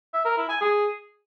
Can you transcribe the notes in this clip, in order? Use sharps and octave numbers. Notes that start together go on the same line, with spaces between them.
E5
A#4
E4
G#5
G#4